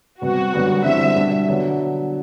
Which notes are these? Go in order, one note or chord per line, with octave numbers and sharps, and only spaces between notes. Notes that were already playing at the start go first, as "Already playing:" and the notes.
C3 G3 B3 F#4
F#2 D3 G3 B3 D4
D3 G3 C4 E4 E5
B2 G3 D4
D3 F#3 B3 D4